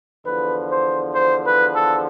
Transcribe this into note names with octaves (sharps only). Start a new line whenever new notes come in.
E2 D3 F3 B4
C5
C5
B4
A4